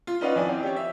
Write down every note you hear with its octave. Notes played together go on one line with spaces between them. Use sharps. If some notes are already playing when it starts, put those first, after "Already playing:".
F4
C#4 D#4 B4 D5 F5 F#5
F2 E4 D5 G#5
C4
G4 C#5
E5